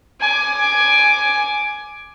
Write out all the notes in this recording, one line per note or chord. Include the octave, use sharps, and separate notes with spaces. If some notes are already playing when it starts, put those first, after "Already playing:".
G#5 D6